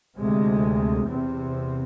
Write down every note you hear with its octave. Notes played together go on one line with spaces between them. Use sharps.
D2 C3 G#3
E2 C3 C4